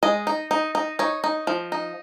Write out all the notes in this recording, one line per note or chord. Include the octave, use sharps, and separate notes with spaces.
G#3 D#5
D#4
D#4
D#4
D#4 C#5
D#4
F3
D#4